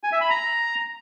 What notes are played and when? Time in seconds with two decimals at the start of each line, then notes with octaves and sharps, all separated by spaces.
0.03 G#5
0.12 E5
0.21 B5
0.30 A#5